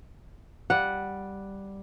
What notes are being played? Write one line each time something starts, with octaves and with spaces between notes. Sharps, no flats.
G3 F#5